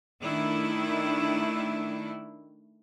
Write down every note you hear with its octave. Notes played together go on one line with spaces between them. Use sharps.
D#3 A3 D4 E4